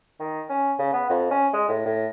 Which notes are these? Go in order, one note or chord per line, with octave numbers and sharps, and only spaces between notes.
D#3
C#4
C#3
B3
F2
C#4
G#3
A2
A2